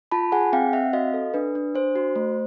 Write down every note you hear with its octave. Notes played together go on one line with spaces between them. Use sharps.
F4 A5 B5
G#4 F#5 G#5
C4 F5 G5
C4 E5 F#5
F#4 D#5 F5
A4
D4 B4
D4
D4 C5
F#4
A3